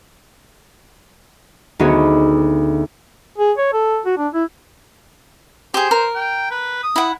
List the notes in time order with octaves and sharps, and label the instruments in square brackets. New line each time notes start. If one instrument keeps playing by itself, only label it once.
[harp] D2 B3 D#4 F#4 G#4 C#5
[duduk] G#4
C#5
A4
F#4
D4
E4
[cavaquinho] G4 G#4 [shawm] C5
[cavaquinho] A#4
[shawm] G5
B4
D#6
[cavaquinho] E4 F#5